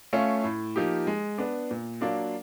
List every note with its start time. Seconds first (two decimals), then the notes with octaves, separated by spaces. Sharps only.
0.13 A3 C#4 F4
0.44 A2
0.76 F3 A#3 D#4 G4
1.07 G#3
1.38 B3 D4
1.71 A#2
2.01 F#3 A#3 D4 F4